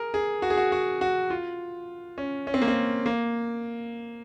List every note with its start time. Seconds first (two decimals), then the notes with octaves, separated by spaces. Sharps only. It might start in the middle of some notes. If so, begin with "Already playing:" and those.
Already playing: G#4 A#4
0.14 G#4
0.42 F#4
0.50 G#4
0.57 F#4
0.72 F#4
1.01 F#4
1.30 F4
2.18 C#4
2.47 C#4
2.54 C4
2.62 A#3
2.68 C4
3.06 A#3